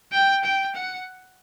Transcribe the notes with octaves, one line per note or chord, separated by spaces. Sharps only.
G5
G5
F#5